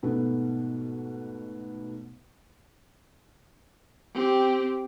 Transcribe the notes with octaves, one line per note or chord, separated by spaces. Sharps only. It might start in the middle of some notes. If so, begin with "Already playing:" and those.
G#2 B2 A3 B3
C4 G4